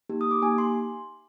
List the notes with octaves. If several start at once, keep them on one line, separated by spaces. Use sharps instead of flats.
A#3 D#4 G4
D#6
D6
A#3 D#4 G4 G#5
C6